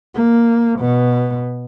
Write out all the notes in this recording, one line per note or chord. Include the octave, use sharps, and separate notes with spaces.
A#3
B2